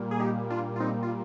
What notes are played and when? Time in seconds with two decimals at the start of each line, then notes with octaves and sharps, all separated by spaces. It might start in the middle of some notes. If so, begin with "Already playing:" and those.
Already playing: A#2 G3 A#3
0.11 G#4
0.20 D#4 G4
0.50 D4 F4
0.76 F4
0.80 C4 D#4
1.03 F4